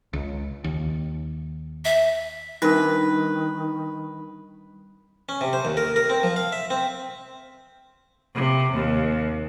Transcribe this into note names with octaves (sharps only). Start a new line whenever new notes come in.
C#2
D#2
E5
D#3 G3 C4 D4 D#4 A#4 B4
C#4
C3
C5
D#2
A#4
A#4
C4
F3
F5
E5
C4
C3
D#2